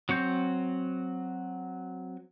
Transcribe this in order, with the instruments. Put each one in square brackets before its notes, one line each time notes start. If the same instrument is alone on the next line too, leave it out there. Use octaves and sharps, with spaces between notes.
[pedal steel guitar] F#3 C4 C#6 G6